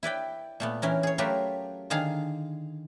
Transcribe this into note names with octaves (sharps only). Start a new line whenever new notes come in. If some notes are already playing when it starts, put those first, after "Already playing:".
E4 B4 D5 G5
A#2 A3 B3
E3 C#4 A#4
G#4 C#5
F#3 A3 F4 G4 A#4 B4
D3 D#3 G#4 F5 A#5